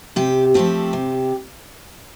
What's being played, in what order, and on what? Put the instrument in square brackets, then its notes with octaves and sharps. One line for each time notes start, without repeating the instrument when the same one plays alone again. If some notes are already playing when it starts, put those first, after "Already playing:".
[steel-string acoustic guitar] C3 G4
F3 A3 C4 G4
C3